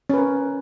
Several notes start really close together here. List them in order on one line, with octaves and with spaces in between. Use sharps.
C#4 B4 A#4